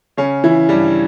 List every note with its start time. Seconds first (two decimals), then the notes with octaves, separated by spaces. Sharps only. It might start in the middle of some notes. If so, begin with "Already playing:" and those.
0.17 C#3 C#4
0.44 E3 E4
0.69 G2 G3